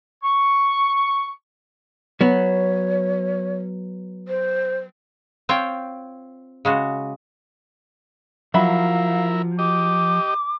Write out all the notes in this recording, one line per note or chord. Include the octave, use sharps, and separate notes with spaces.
C#6
F#3 B3 C#5
C5
C4 F4 C#5 G5
C#3 G#3 F#4
F3 F#3 E4 A#4 E5 F5 B5
G4 D#5 D6